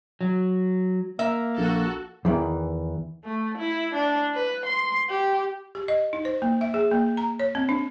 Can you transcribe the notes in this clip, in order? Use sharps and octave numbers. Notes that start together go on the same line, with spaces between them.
F#3
A#3 A#4 E5
A#1 F#4 A4
E2 D#3 E3
A3
E4
D4
B4
C6
G4
G4
D#5
D#4
C5
A#3
E5
G#4
A#3
A#5
C#5
C4
D4